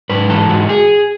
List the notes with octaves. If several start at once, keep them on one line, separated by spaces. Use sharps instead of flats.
G#2 B4
E3 A4
G#2 F#4
G#4